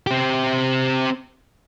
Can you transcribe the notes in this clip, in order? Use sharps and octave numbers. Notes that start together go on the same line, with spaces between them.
C4 G4